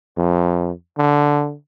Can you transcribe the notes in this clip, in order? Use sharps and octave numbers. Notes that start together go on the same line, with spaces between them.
F2
D3